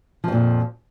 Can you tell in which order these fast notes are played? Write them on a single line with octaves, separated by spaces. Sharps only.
F3 F2 A#2